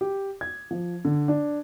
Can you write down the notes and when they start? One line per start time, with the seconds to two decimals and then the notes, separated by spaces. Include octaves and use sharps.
0.01 G4
0.41 G#6
0.71 F3
1.05 D3
1.28 D4